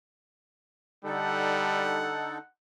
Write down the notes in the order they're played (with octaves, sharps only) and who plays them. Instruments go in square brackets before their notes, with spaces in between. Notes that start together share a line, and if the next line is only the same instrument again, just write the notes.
[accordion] D3 D#4 A4 [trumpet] G3 [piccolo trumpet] F#5